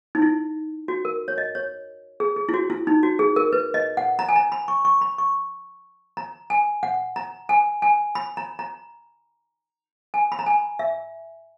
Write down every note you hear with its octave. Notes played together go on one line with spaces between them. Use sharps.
D#4
E4
F#4
A#4
C#5
D#5
C#5
G#4
G#4
E4
F#4
E4
D#4
F#4
G#4
A#4
B4
D#5
F#5
A#5
G#5
A#5
B5
C#6
C#6
B5
C#6
A#5
G#5
F#5
A#5
G#5
G#5
B5
A#5
A#5
G#5
B5
A#5
G#5
E5